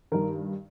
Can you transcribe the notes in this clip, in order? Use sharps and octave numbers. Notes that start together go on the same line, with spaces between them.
G2 D#3 A#4